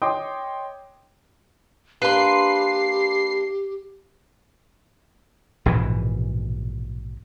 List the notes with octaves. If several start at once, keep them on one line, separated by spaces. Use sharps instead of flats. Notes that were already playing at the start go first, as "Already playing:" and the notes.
C#5 D#5 G5 C6 D6 D#6
A#3 D4 G4 B4 C6 C7
A#1 G#2 B2 E3